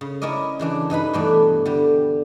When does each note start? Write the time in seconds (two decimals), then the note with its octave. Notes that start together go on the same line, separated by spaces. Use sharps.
0.01 C#3
0.22 C#4 E4 A#4 D5 D#5
0.59 C#3 E3 D4
0.90 G2 D#4 B4 B5
1.13 G2 B2 E3 A3 D4
1.65 D3 G3